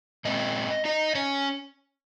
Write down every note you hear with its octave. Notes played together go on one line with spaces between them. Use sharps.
A#2 G#3 C4 D#5
D#4 D#5
C#4 C#5